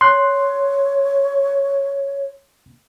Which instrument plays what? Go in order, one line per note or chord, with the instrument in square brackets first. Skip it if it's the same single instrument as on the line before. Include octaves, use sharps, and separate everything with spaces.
[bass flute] C#5 [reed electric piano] C6 F#6